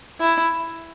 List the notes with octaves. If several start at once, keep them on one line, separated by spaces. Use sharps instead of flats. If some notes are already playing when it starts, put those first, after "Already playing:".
E4